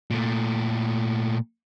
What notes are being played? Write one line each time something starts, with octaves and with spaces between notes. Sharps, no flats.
A#2 A3